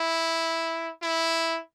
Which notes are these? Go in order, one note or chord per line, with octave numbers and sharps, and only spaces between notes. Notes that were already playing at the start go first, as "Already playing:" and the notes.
Already playing: E4
E4